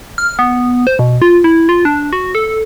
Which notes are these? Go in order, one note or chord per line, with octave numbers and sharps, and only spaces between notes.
F6
B3
C5
B2
F4
E4
F4
D4
F#4
A4